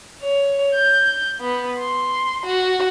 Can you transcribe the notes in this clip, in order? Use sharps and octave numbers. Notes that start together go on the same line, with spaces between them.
C#5
G6
B3
C6
F#4